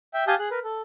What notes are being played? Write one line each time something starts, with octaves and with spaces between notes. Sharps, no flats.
E5 G5
G4 F5 G#5 A5 D#6 G6
G#4 F#6
A#4 B4
A4